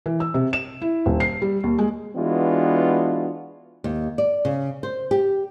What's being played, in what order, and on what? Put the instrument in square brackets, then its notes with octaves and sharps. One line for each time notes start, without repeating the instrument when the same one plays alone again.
[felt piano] E3
E6
C3
E7
E4
D#1
C7
G3
D#2
G#3
[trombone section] E3 G#3 B3 D4 F4 F#4
[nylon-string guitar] D#2
D5
C#3
C5
G4